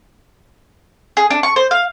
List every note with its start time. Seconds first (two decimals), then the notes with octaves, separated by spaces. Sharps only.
1.17 G#4
1.30 D4
1.43 C#6
1.56 C5
1.71 F5